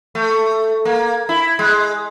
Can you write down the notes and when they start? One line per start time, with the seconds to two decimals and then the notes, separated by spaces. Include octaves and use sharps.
0.15 A3
0.85 A#3
1.29 E4
1.59 G#3